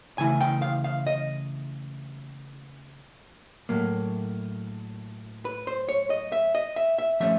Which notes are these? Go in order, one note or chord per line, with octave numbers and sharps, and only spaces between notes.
C#3 E3 A3 E4 G#5
G5
F5
F5
D#5
A2 F#3 A#3
B4
C5
C#5
D#5
E5
D#5
E5
E5
F3 A3 C#4 E5